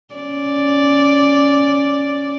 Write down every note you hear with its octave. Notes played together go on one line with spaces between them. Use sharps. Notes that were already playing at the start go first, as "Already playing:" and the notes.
C#4 D5